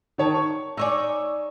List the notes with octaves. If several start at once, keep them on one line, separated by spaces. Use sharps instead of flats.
D#3 C#5 A5
C#6
D#4 C#5 D5 G#5 E6